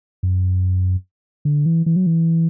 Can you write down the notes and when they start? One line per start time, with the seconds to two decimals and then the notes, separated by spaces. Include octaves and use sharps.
0.23 F#2
1.45 D3
1.66 E3
1.86 E3
1.96 F#3
2.06 E3